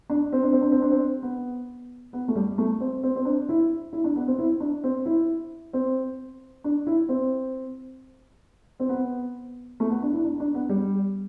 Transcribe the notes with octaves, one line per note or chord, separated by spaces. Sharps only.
D4
C4
D4
C4
D4
C4
D4
C4
B3
B3
A3
G3
A3
C4
C4
C4
D4
E4
E4
D4
B3
C4
E4
D4
C4
E4
C4
D4
E4
C4
C4
B3
A3
B3
D4
E4
D4
D4
B3
G3